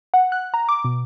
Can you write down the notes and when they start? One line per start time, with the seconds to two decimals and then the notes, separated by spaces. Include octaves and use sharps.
0.14 F#5
0.32 F#6
0.54 A#5
0.69 D6
0.84 B2